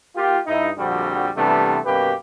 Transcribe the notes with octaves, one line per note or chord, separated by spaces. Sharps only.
A#3 F4 G4
G2 D#4 E4
A#1 F2 D3 G3 C4 F#4
C3 E3 G3 A3 B3 D4
F#2 B2 A#3 G4 B4